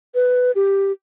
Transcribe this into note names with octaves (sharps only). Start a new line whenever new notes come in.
B4
G4